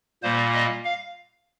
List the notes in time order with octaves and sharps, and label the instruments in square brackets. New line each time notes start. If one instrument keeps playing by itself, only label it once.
[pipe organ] A#2 G3 A#3 C5
D#5
F5